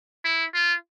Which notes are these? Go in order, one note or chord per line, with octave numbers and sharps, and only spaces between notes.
E4
F4